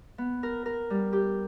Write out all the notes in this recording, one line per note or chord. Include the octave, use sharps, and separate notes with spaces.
B3
A#4
A#4
G3
G4